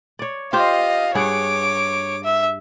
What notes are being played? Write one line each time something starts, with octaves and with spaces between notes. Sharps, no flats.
C#5 D5
F4 G4 C5 D#5 F5
G2 G#4 C#5 F#5 D6
E5